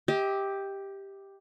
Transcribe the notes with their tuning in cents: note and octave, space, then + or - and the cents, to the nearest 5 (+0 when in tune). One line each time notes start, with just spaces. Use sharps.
G4 +5 D#5 +45